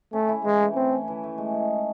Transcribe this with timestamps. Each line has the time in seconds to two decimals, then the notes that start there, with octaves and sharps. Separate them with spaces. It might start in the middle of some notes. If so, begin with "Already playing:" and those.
0.13 A3 C#4
0.29 E4
0.44 E3 G#3
0.60 A3
0.76 C4 C#4
0.91 E4
1.08 E3
1.23 A3
1.38 G#3
1.54 D#4